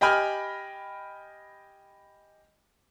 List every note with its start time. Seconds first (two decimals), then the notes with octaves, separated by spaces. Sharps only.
0.01 G4 D#5 G5 G#5 B5 F6